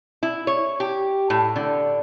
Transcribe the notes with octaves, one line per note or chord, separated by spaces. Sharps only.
E4
C#5
G4
A2
D3